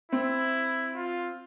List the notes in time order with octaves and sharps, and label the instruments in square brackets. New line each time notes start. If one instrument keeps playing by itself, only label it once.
[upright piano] C4 [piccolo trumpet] E4
[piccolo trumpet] F4